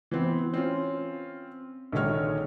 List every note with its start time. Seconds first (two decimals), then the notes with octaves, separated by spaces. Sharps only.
0.11 E3 B3 C4
0.54 C4 C#4 F4
1.92 A#1 D3 D#3 G#3 C#5 F6